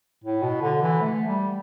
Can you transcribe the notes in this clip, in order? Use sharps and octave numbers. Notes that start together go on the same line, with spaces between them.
A2
B2
D3
E3
A3
G3